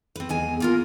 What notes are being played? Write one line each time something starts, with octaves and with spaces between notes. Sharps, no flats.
C4 B4
E2 G#3 G#5
A#3 F4 A#4